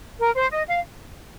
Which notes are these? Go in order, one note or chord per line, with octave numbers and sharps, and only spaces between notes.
A#4
C5
D#5
F5